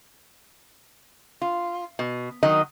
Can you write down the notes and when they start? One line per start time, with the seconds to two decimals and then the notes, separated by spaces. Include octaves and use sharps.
1.42 F4
1.99 B2
2.43 D#3 F#3 D#5